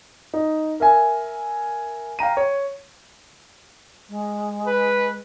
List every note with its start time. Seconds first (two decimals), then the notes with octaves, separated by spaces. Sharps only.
0.34 D#4
0.80 A#4 E5 G#5
2.19 F5 G5 A#5 D#7
2.37 C#5
4.09 G#3
4.67 B4